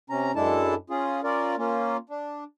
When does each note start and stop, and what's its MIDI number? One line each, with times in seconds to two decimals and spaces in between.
0.10 0.32 48
0.10 0.32 61
0.10 0.32 82
0.35 0.75 42
0.35 0.75 56
0.35 0.75 62
0.35 0.75 64
0.35 0.75 69
0.35 0.75 81
0.90 1.21 61
0.90 1.21 65
0.90 1.21 68
1.24 1.55 61
1.24 1.55 65
1.24 1.55 70
1.24 1.55 74
1.58 1.97 58
1.58 1.97 61
1.58 1.97 65
2.09 2.44 62